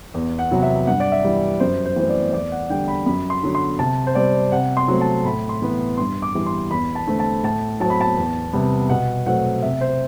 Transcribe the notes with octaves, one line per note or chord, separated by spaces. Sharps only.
E2
F#5
C3 F#3 B3
E5
G2 F#5
D5
E5
E3 G3
F#2 C5
C5
E3 A3 C4
D5
E2 D5
F#5
D3 G3 G5
B5
F#2 B5
C6
D3 F#3
C6
C3 A5
C5
G3 C4 D5
C3 F#5
C6
F#3 A3 C4
A5
A2 B5
C6
E3 B3
G2 C6
D6
E3 G3 B3
C6
E2 B5
A5
D3 A3 C4
A5
A2 A5
F#3 C4 A5
B5
A5
E2
C3 G3 B3
B2 F#5
F#3 A3 C4 F#5
C3 E5
C5